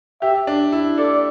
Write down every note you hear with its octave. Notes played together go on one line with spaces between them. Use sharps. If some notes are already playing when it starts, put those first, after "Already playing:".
G4 E5
D4
E4
A4 D5